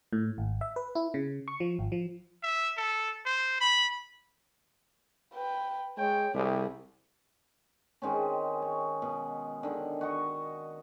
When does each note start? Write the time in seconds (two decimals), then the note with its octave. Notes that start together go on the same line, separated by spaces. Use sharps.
0.13 A2
0.38 G#1
0.61 E5
0.76 B4
0.95 E4
1.14 C#3
1.48 C#6
1.60 F3
1.79 G#1
1.92 F3
2.43 E5
2.77 A4
3.25 C5
3.60 B5
5.34 B4 G5
5.98 G#3 C#5 G5
6.35 C2 C3 G4 G#4
8.02 D#3 G#3 C4 C#4
8.62 C#5
9.02 B2
9.63 D3 D#3
10.01 F#4 D#5 C#6